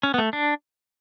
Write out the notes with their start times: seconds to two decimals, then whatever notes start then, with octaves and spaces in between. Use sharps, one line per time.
0.03 C#4
0.14 B3
0.18 A3
0.33 D4